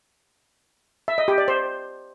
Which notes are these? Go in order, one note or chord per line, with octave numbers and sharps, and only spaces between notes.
E5
D#5
G4
D5
C5